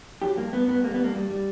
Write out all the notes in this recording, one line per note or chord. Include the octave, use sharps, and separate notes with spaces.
F#3 G4
G2 A#3
G2 B3
G2 B3
G3 A#3
B3
G2
A#3
G3
G3